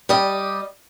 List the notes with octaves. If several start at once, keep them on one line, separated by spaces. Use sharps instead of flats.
G3 G4 D#5